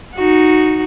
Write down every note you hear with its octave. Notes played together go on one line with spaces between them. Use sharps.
D#4 F#4